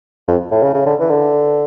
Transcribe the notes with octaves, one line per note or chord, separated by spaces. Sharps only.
F2
A2
C#3
C#3
D3
E3
D3